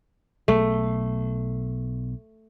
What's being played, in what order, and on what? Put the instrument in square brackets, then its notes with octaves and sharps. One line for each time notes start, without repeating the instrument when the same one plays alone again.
[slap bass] B1 [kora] A3